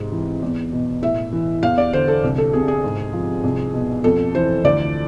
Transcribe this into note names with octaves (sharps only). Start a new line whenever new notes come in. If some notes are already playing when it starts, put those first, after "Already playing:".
Already playing: G#2 C3
E3
E2
B2
A2 E5
E3
E2 F5
D5
D3 C5
A4
C2
A4
C3 G#4
G#4
G#2
F3
C2
B2
F2 A4
E3 C5
D2 D5